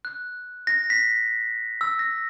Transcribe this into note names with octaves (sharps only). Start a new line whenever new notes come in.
F#6
A#6
B6
E6
A#6